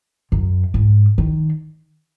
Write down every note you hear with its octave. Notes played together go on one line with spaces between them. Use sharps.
F#2
G#2
D#3